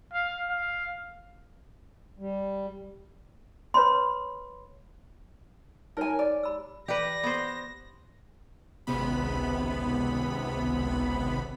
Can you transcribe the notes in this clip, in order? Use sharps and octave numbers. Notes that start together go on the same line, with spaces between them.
F5
F5
G3
B4 C#5 B5 C6
D#4 A#4 C#5 G#5
D5
G4 B5 E6
E3 G4 B4 D5 A#6
B3 C5
G#1 C#2 C3 B3 B5